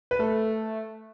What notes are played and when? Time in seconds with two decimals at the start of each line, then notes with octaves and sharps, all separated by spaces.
0.11 B4
0.19 A3 A4